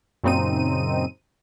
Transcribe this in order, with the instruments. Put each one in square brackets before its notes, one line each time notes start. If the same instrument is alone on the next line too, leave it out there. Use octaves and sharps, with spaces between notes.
[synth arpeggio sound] F#2 A#2 C#3 C4 D#4 D#7